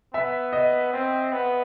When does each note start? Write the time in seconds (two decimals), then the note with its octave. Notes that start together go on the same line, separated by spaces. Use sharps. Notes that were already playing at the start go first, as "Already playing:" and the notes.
0.13 B3 E5
0.53 D#5
0.93 C4
1.32 B3